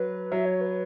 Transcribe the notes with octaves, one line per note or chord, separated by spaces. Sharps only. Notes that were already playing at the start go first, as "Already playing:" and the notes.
Already playing: F#3 B4
F#3 E5
C#5
B4